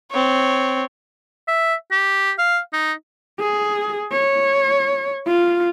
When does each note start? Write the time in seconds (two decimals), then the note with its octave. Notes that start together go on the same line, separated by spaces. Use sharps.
0.11 C4 C#5
1.48 E5
1.91 G4
2.38 F5
2.73 D#4
3.40 G#4
4.12 C#5
5.27 F4